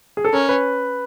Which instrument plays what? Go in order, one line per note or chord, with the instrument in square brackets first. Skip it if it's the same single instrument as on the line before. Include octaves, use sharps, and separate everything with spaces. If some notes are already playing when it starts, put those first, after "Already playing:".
[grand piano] G#4
A4
[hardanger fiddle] C#4 [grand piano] A#4
[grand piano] B4